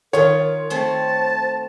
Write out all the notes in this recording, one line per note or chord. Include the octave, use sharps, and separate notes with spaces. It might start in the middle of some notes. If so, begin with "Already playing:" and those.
D#3 F4 A#4 C#5
A3 C4 C5 A5